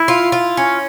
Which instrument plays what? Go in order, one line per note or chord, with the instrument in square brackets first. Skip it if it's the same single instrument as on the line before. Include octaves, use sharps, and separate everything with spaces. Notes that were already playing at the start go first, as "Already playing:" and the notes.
Already playing: [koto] E4
[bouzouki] F4
F4
C#4